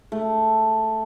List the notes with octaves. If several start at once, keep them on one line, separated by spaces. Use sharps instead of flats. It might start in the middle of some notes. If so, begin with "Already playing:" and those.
A3